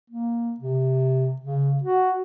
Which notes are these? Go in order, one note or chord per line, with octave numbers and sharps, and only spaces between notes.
A#3
C3
C#3
F#4